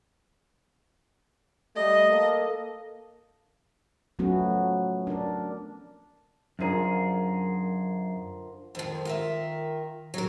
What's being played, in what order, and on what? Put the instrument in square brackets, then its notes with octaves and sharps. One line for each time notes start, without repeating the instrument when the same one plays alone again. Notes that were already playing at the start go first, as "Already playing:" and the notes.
[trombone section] G3 A3 [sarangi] D#5
[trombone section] A#3 A4
[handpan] F3 F#3 A3 B3 C#4 F#4
D4 A#4
[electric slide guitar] F#2 G#4 [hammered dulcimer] D3 F3 A#4
[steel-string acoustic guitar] F2 F3 [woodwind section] D#3
[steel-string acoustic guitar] F4 A#4 E5
F#3 A#4